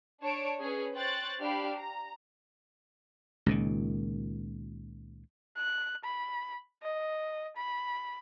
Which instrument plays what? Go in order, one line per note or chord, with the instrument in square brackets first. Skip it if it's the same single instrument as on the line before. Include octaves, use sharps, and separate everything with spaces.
[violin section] D4 C#5 A5 D7
C#4 G#4 B4
C5 C#5 G5 F#6 A6
D4 G4 F5 B5
A#5
[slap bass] C#2 A#2 D#3
[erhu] F#6
B5
D#5
B5